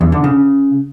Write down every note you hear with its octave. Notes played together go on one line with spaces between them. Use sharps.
E2
D3
C#3